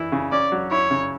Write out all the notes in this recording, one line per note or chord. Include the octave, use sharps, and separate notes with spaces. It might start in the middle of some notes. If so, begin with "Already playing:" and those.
Already playing: E3 E4
C#3
C#4 D5
F#3
E4 C#5
C#3